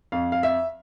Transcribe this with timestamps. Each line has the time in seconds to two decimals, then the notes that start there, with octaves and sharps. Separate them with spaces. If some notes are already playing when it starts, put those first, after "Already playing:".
0.12 F2 F5
0.32 F5
0.43 E5